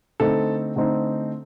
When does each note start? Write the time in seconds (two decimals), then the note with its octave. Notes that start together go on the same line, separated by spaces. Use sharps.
0.20 D3 A3 C4 D#4 A4
0.76 D3 A3 C4 D#4